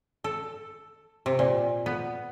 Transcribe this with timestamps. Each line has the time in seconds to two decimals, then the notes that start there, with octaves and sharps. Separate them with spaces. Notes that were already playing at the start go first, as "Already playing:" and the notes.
0.24 A4
1.26 C3
1.39 A#2
1.86 B3